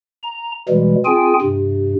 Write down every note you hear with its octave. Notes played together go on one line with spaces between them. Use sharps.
A#5
B2 E3 G3 G#3
C4 F4 G#4 G5 G#5
G2 C3